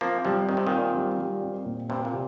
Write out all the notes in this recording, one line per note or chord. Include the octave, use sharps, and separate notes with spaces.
F3 A#3 C4
C3 F3 G3
D#3 C4
C3
A#2 D#3
C4
G3
G3
C4
A#2
G2 C3 C4
A#2
C3